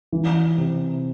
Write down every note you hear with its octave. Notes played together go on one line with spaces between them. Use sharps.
E3
C3